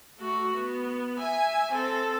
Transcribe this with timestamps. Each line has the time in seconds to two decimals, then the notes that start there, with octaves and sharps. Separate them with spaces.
0.19 A3 F#4
0.54 B3
1.18 E5 G#5
1.72 C4 A4